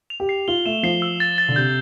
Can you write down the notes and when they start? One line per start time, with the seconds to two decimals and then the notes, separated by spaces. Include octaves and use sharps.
0.10 F7
0.20 G4
0.29 C7
0.48 F4 G7
0.66 A3 E7
0.83 F3 C7
1.02 E6
1.20 A6
1.38 A6
1.48 D3
1.56 C3 G6